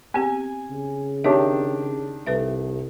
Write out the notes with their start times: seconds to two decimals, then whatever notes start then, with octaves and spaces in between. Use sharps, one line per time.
0.14 B3 C4 G4 G#5
0.71 C#3
1.24 D#3 C4 D4 G4 C#5 E5
2.26 C2 A4 B4 E5